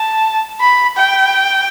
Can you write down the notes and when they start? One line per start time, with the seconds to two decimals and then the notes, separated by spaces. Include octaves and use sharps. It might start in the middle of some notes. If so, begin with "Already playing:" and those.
Already playing: A5
0.60 B5
0.97 G5